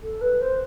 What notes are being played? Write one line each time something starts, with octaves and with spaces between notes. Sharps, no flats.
A4
B4
C5